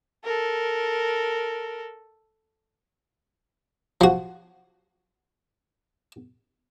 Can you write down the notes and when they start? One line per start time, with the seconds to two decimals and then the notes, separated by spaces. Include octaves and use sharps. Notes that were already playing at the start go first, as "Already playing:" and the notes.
0.24 A4 A#4
4.01 F3 F#4